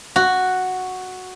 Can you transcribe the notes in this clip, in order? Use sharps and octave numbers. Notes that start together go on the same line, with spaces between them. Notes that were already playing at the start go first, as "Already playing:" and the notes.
F#4